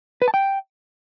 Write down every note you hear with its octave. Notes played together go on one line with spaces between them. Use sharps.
B4
A5
G5